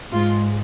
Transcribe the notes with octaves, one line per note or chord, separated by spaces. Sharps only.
G#2 G#3 F4